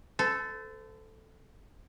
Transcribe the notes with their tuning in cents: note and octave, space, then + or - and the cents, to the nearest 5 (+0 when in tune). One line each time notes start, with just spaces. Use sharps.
A4 +0 C5 -40